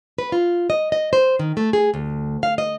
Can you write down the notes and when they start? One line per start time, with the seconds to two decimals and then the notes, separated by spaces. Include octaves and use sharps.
0.18 B4
0.32 F4
0.70 D#5
0.92 D#5
1.13 C5
1.39 D#3
1.57 A3
1.73 G#4
1.94 D2
2.43 F5
2.58 D#5